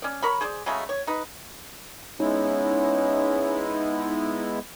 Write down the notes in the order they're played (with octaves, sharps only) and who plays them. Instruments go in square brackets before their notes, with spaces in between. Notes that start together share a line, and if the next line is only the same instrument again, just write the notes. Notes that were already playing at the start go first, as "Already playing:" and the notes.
[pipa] C#4 D5
A#4 C#5 B5
G#4 C5 D5
C#3 F#3 G#3 A3
C#5
D#4 B4
[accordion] G#3 B3 E4 [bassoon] C#4 [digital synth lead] D#4